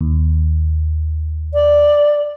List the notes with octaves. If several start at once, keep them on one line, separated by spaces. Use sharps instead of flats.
D#2
D5